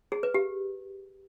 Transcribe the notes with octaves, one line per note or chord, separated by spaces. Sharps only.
G#4
B4
G4